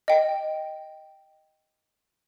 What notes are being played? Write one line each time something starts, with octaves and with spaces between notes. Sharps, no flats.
D#5 G5